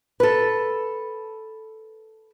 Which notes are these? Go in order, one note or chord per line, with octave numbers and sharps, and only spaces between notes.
A4 B4